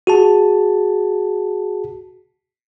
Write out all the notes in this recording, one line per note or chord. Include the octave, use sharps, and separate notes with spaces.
F#4 G#4 A5